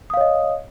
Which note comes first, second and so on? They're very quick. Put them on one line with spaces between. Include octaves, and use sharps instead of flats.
D#6 F5 C#5 D#5